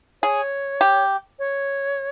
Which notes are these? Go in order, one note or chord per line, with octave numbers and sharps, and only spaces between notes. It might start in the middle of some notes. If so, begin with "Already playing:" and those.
G#4 C#5
G4
C#5